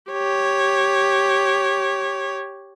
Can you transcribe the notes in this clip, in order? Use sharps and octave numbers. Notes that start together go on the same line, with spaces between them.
G4 C#5